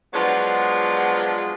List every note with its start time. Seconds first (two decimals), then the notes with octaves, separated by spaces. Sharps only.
0.14 F3 F#3 G#3 B3 D4 F4